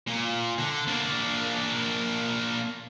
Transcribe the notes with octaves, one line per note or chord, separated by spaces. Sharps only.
A#2
D3
A#3 D4